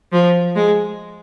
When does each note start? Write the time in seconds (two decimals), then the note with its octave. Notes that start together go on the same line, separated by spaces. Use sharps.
0.12 F3
0.55 G#3